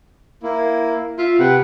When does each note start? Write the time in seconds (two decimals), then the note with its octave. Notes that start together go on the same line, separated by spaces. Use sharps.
0.43 A#3 E4
1.19 F4 E5
1.39 C3 B4 F#5 G5